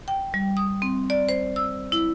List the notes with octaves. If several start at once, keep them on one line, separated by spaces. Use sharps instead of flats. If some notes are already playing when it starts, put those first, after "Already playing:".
G5
G3
D#6
C4
D5
C5
E6
E4